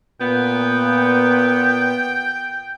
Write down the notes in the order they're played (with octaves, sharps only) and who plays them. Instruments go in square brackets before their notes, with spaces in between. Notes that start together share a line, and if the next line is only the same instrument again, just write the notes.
[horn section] A#2 B3 [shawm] G5